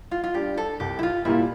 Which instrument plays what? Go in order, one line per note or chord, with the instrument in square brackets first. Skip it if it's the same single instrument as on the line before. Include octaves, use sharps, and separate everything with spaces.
[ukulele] F4
F4
[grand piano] G3 D4 [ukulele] G4
[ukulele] A4
[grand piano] C2 [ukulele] G4
[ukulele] E4
F4
[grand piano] A#2 G3 A#3 F4 [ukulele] E4